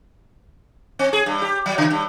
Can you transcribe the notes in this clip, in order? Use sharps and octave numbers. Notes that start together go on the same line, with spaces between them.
C4
G#4
G2
G4
F#3
C#3
G2